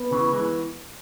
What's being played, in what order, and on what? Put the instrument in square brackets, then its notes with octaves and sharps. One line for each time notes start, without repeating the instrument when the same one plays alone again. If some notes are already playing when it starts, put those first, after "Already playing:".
Already playing: [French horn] B3
[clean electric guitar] C#3 E3
E3 G#3